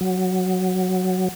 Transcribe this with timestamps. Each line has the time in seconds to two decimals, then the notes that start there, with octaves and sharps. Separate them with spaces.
0.01 F#3